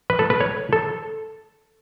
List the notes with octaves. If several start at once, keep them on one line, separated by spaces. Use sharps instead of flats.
B4
A4
B4
C#5
A4